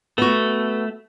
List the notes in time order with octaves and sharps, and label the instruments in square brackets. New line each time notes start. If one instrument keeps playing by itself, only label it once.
[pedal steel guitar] A3 [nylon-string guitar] B3 F#4